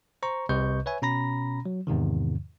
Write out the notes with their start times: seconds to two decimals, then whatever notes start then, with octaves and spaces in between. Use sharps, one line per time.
0.23 C5 A#5 C#6
0.49 C2 C3 B4 D#5 C#6 G6
0.86 B4 C#5 E5 G#5
1.02 B2 C#4 A#5 B5 A#6
1.66 F#3
1.87 E2 G#2 C3 D#3